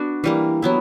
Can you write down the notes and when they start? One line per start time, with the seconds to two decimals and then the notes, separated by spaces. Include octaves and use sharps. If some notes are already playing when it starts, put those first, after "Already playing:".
Already playing: B3 D4 F#4
0.24 E3 G3 A#3
0.62 F#3 B3 E4